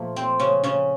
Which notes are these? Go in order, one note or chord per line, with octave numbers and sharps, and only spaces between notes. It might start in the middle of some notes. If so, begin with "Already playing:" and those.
Already playing: A#2 F3 A3 A#3
C4
C#3 C#4
C#3 C#4